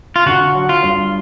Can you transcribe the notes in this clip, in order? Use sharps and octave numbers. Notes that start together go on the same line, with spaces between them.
F4
D3 F#4
F#3
F4
G2